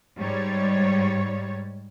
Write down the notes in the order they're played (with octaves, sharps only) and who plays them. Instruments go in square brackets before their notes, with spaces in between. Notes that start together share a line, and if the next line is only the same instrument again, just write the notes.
[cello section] G#2 G3 C#5